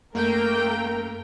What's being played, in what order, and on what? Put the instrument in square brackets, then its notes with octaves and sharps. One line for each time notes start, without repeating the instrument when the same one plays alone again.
[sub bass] F#2 [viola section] A3 G5 [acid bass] A#3 [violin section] A#4